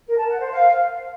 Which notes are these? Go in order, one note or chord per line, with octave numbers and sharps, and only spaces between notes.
A#4
A5
F#5
C5
F5